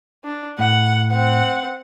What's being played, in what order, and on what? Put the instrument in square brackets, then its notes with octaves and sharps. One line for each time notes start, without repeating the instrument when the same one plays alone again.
[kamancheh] D4
[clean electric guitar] A2 [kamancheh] F#5
[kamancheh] C4 F#5